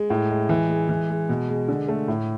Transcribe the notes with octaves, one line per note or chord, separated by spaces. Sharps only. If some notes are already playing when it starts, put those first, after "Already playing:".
Already playing: G#3
A2
G#3
E3
G#3
E3
G#3
B2
G#3
D3
A3
A2